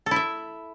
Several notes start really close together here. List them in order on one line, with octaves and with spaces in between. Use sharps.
A4 E4 E5